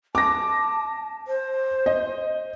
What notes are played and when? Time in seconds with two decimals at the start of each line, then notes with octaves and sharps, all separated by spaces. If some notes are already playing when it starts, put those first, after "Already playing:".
0.15 A5 D6 A#6
1.28 C5
1.86 D#5